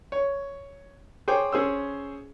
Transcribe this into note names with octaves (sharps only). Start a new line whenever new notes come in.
C#5
G#4 C5 C#5 G5 D6
C#4 G#4 C5 E6